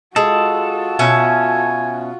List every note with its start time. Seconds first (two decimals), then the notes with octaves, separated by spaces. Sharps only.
0.16 G#3 F4 F#4 A4
0.99 B2 C#4 E5 G#5